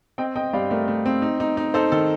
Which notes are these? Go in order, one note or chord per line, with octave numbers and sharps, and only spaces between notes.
C4 D#5 G5
C4 D#5 G5
G2 D5 F5
A3 A#4 D5
A3
C4
D#4
D#4
D#4
D#4 A4 C5
D#3 A4